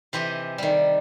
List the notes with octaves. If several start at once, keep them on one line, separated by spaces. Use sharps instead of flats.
C3 E3 G4 D#5
D#3 G3